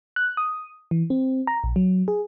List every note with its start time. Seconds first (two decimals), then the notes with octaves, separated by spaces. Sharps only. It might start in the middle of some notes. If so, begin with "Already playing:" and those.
0.16 F#6
0.37 D#6
0.91 E3
1.10 C4
1.47 A#5
1.64 A#1
1.76 F#3
2.08 G#4